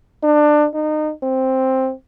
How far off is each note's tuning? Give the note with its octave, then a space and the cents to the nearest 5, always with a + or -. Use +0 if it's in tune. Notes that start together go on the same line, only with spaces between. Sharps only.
D4 +25
D#4 -25
C4 +5